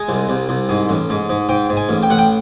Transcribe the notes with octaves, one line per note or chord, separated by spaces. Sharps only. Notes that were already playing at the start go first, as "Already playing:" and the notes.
Already playing: G#3 G#5
C2
C2
C2
G#2
A1
G#2
G#2
G#2 G5
G#2
G#5
A1
G5
A1 F#5
G5